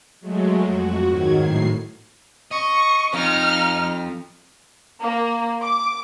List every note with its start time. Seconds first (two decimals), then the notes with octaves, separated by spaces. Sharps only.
0.21 F#3 G#3 A3
0.60 F2 F#4
1.08 G#2 D#3 F#3 G#6
1.39 A2 C7
2.51 D#5 C#6
3.14 F2 D#4 F6
5.02 A#3
5.62 D6